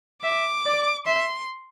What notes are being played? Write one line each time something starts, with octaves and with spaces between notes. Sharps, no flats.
E5 D6
D5
E5 C6